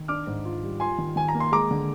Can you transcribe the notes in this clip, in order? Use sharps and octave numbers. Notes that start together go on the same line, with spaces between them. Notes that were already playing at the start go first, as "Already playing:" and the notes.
Already playing: D#3
D4 D6 F6
G#2
F4
G3
F4 G#5 C6
D#3
D#3 G#5
A#5
A#3
C6
G#3 A#5 D6
D3